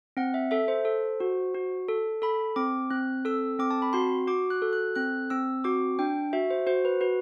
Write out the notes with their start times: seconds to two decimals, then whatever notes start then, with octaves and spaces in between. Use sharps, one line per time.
0.17 C4 F#5
0.34 E5
0.51 A4 E5
0.68 C5
0.85 A4
1.20 F#4
1.54 F#4
1.88 A4
2.22 A4 B5
2.56 C4 D6
2.91 C4 F#6
3.25 A4 E6
3.59 C4 D6
3.71 A5
3.82 B5
3.93 F#4 C6
4.27 F#4 D6
4.50 F#6
4.62 A4
4.73 F#6
4.96 C4 F#6
5.30 C4 E6
5.64 F#4 D6
5.99 D4 G5
6.33 F#4 E5
6.50 C5
6.67 F#4 C5
6.85 B4
7.01 F#4 B4